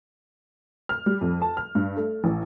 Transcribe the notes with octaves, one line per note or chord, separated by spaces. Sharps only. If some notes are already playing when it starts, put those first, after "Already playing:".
F6
G3
F2
A5
F6
G2
A3
A1